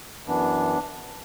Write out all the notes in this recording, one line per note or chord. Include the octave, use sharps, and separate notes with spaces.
F#2 E3 B3 D4